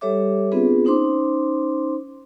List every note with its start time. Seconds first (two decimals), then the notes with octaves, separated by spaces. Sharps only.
0.01 G3 G4 A4 C#5 E5 D6
0.52 B3 C4 D4 F4 G#4 B4
0.85 C#4 D#4 C5 C6 D6